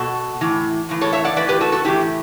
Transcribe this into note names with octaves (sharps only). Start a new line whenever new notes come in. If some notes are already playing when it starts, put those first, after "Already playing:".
Already playing: B2 F#4 A4
A2 E3
A2 E3
A4 C#5
C#5 E5
D5 F#5
A2 E3 B4 D5
G4 B4
F#4 A4
F#4 A4
A2 E3 E4 G4